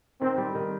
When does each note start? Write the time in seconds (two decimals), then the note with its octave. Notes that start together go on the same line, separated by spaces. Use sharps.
0.22 D#3 C4
0.38 G3
0.55 D#3